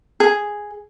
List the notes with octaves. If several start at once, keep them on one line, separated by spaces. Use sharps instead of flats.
G#4